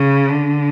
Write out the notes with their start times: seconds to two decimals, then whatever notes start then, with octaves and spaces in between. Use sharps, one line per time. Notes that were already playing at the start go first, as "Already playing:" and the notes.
Already playing: C#3
0.28 D3